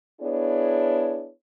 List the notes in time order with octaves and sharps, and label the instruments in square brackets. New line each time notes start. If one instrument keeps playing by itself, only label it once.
[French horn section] B3 D4 E4 G#4 C#5